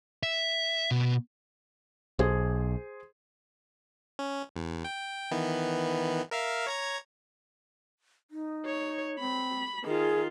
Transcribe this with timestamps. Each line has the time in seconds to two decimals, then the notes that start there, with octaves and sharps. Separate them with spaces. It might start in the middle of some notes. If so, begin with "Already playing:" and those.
0.23 E5
0.91 B2
2.19 B1 G#4 C5
4.19 C#4
4.56 E2
4.85 G5
5.31 D#3 E3 B3
6.31 A#4 E5 F5
6.67 C#5 A#5 G#6
8.31 D#4
8.66 C#5
9.20 C4 B5
9.84 D#3 F4 G#4